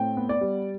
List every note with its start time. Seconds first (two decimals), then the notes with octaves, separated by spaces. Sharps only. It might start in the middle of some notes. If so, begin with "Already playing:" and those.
Already playing: A2 C4 G5
0.17 B3
0.29 D5
0.41 G3